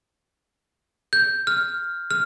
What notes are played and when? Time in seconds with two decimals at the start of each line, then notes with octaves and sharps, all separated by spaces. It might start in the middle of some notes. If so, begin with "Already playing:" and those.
1.13 G6
1.47 F6
2.11 F6